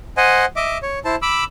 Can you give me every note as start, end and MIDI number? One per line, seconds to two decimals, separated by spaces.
0.17 0.45 72
0.17 0.45 75
0.17 0.45 78
0.17 0.45 80
0.56 0.78 75
0.56 0.78 76
0.56 0.78 86
0.83 0.99 73
1.05 1.16 64
1.05 1.16 72
1.05 1.16 81
1.22 1.44 83
1.22 1.44 86
1.22 1.44 88